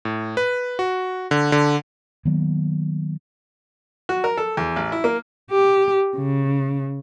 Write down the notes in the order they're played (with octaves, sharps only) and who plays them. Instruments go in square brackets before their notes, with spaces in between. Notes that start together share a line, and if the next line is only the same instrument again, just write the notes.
[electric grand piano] A2
B4
F#4
D3
D3
[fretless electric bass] D#3 F#3 A#3 B3
[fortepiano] F#4
A#4
A4
E2
A1
E4
A#3
[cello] G4
C#3